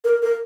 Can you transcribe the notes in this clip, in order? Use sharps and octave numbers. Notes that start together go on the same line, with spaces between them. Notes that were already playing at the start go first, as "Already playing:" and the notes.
A#4
A#4